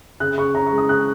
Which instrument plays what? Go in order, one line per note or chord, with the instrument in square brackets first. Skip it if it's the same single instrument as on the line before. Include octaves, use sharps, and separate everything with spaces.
[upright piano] C#3 F#6
C#3 C#6
C#4 A#5
C#6
G#3
D#6
C#3 F#6